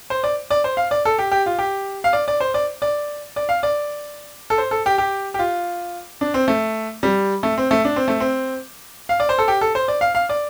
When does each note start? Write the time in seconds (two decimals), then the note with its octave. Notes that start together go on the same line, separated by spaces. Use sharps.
0.10 C5
0.24 D5
0.51 D5
0.64 C5
0.77 F5
0.91 D5
1.05 A4
1.18 G4
1.31 G4
1.46 F4
1.59 G4
2.04 F5
2.13 D5
2.28 D5
2.40 C5
2.54 D5
2.82 D5
3.36 D5
3.49 F5
3.63 D5
4.50 A4
4.58 C5
4.71 A4
4.86 G4
4.98 G4
5.34 G4
5.39 F4
6.21 D4
6.34 C4
6.48 A3
7.03 G3
7.43 A3
7.58 C4
7.71 A3
7.85 D4
7.96 C4
8.08 A3
8.20 C4
9.09 F5
9.20 D5
9.29 C5
9.38 A4
9.48 G4
9.61 A4
9.75 C5
9.88 D5
10.01 F5
10.15 F5
10.29 D5